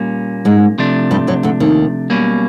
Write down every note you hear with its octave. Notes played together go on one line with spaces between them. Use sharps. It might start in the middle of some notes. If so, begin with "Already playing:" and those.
Already playing: A#2 G3 A#3 C#4
G#2 G#3
C3 F3 A3 D4
G2 G3
F#2 F#3
D2 D3
D#2 D#3
B1 B2 G3 A#3 C#4